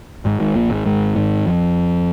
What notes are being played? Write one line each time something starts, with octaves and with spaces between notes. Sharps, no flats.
G#1 G#2
G#1 G#2
A#1 A#2
G#1 G#2
G#1 G#2
G#1 G#2
F2